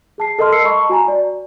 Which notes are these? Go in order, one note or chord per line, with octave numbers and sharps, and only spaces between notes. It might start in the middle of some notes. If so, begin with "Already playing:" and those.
G#4 A5 C7
A4 A#4 D#5 A5 C6 F6
E6 C7 C#7
D#5 A5 B5 C#6
F#4 G#5 A#5
D5